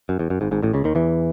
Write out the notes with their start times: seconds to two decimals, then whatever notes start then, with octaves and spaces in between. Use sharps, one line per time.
0.09 F#2
0.19 E2
0.30 F#2
0.41 G#1 G#2
0.51 G#1 G#2
0.63 A1 A2
0.73 C#2 C#3
0.84 D#2 D#3
0.95 E2 E3